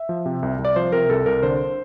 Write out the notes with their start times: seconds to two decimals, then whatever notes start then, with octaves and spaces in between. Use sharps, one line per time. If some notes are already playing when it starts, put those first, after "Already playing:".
Already playing: E5
0.09 F3
0.26 C3
0.43 C2
0.59 C2
0.65 D5
0.76 F3 C5
0.92 C3 A#4
1.09 C2 A4
1.26 C2 A#4
1.43 D3 C5